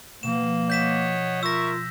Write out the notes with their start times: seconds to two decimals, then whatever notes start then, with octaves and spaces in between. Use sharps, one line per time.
0.23 B2 F3 A#3 E7
0.70 C#5 D#5 F#5 G6 B6 E7
1.43 F4 A#4 E5 C#6 E6 A#6